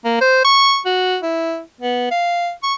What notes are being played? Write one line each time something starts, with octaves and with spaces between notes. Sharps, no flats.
A#3
C5
C#6
F#4
E4
B3
F5
C#6